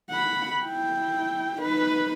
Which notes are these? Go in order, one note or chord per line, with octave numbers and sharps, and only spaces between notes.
F#5 B5
E4 G5
D#4 B4